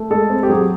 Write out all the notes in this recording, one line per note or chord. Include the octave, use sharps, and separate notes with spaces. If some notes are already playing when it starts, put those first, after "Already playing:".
Already playing: A3
G#3 A4
C4
G4
F#3 G#4